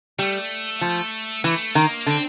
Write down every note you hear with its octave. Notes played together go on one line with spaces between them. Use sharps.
G3 A3
F3
E3 A3
D#3 A#3
D3 C4